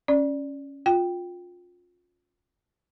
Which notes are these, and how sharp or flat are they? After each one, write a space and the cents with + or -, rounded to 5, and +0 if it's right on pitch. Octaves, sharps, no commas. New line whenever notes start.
C#4 +0 D5 +0
F4 +25 G5 +0